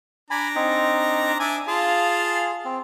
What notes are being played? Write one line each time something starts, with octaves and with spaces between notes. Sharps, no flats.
D4 G#5 A#5 B5
C4 D#4
D4 E5 G#5
F4 G#4 F5 A5
C4